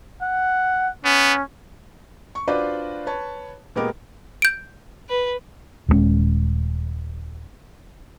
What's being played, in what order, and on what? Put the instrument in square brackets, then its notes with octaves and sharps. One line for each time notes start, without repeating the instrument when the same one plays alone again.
[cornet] F#5
[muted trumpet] B3 [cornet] C#4
[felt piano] C#6
D4 F4 F#4 B4 C5 D5
B4 C#5 A5
A#2 G#3 B3 G4 A#4
[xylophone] G6 D7
[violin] B4
[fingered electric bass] D#1 G2 G#3 C#4